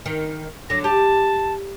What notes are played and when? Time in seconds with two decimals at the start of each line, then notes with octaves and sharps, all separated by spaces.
0.06 D#3
0.70 D3 F#3 A#6
0.84 G4 A5